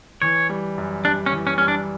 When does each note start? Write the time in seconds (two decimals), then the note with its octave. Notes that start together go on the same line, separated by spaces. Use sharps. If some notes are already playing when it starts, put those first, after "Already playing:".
0.22 E3 C#5
0.49 G3
0.78 F#2
1.05 G3 D4
1.26 C#4
1.33 E3
1.47 C#4
1.58 G3 C#4
1.68 D4